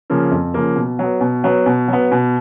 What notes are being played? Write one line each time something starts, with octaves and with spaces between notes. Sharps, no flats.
C#3 F3 A#3
F2
C#3 F3 A#3
B2
F#3 B3
B2
F#3 B3
B2
F#3 B3
B2